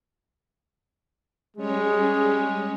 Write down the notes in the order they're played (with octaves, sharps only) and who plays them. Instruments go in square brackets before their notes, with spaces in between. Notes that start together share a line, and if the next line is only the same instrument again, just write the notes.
[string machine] G3 C#4 C#5 [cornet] G#3 [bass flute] G#4